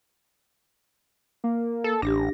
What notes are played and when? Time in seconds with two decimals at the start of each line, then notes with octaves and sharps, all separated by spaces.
1.44 A#3
1.84 A4
2.02 A1 D4 G4 A#6